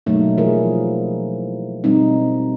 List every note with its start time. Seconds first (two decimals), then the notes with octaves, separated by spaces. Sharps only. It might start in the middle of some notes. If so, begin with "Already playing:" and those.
0.06 B2 F#3 A3 A#3 D#4
0.37 E3 F3 E4 G#4 A#4
1.84 B2 G3 C4 D#4